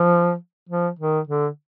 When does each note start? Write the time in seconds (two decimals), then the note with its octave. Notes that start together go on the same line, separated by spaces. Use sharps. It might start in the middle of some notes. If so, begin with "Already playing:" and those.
Already playing: F3
0.69 F3
0.99 D#3
1.27 D3